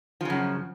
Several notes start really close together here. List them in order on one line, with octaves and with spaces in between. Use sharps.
F3 C#3 F#2